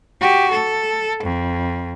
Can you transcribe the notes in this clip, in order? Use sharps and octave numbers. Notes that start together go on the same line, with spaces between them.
F#4 G4
A4
F2